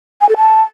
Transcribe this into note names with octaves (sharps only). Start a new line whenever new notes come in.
G#5
A4
A5